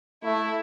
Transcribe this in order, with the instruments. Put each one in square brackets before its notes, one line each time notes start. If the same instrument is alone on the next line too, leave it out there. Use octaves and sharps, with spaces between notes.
[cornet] A3 [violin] E4